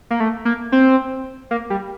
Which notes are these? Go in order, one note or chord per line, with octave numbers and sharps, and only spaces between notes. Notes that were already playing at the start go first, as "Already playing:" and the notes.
A#3
A3
A#3
C4
A#3
G3